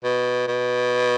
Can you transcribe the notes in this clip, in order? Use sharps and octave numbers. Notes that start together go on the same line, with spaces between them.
B2
B2